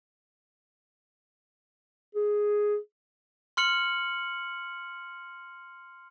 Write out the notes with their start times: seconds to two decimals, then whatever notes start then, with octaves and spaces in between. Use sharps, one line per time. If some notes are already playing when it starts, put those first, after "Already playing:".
2.15 G#4
3.57 C6 F6 C#7 F#7